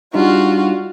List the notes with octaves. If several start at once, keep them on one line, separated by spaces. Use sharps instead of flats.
G3 D4 D#4 F4 F#4